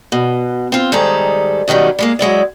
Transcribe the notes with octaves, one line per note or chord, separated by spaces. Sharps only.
B2
C4 F4
G#2 D#3 G3 G#4 A4 A#5
B2 D#3 F#3 G3 C#4
G3 G#3 A#3
F#3 G#3 E4 D5